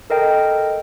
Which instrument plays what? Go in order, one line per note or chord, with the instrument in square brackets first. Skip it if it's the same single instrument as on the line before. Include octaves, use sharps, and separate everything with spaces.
[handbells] A4 A#4 D#5 G5